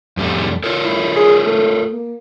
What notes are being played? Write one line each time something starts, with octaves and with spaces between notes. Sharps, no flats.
F2 G3 A3
F4 A4 A#4
E4
G#4
A3
A#3